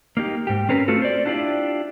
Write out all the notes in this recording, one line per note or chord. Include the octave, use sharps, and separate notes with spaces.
A#3 D#4 G4
G#2 G4
C4 C#4 A#4 B4
A3 C4 F4 F#4 A4
C5 D5
D4 E4 F4 G4 D5